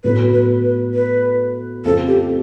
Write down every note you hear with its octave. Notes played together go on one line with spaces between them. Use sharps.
A2 F#3 B3 B4
B4
B4
B4
F2 C#3 F3 A3 C4 A4
G4